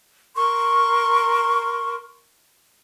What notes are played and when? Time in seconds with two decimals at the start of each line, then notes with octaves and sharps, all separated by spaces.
0.35 A#4 C6 C#6